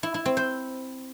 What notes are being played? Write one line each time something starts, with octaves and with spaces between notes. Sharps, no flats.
E4
E4
C4
C5